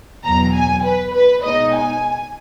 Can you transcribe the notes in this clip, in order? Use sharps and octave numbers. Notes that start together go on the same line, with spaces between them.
E2 B2 F#3 A#5
G#5
B4
B4
B2 G#3 D#4 D#5
G#5